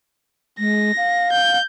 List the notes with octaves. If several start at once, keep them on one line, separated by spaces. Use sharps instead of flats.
G#3 A#6
F5
G6